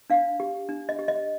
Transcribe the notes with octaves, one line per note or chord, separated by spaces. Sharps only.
D4 F5
G4
D4
D#5
G4
D#5